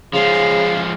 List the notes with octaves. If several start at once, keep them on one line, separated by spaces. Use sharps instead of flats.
C#3 F3 G#3 F5